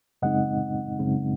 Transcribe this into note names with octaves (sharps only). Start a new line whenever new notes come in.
F#2 C#3 G#3 C4 D#4 D#5 F#5
F#2 C#3 G#3 C4 D#4